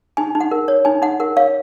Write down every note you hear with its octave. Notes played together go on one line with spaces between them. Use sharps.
D#4 G#5
D#4
F#5
A#4
C#5
D#4 G#5
D#4 F#5
A#4 F#5
C#5 F5